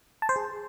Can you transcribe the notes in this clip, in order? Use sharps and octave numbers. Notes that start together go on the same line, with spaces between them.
A5
C5
G#4